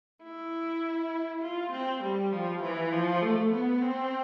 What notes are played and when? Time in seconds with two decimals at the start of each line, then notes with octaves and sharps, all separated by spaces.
0.23 E4
1.42 F4
1.72 C4
2.02 G3
2.32 F3
2.62 E3
2.93 F3
3.22 A3
3.52 B3
3.82 C4